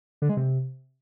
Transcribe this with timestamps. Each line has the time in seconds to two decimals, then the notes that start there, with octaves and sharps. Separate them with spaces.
0.22 D3
0.29 G#3
0.37 C3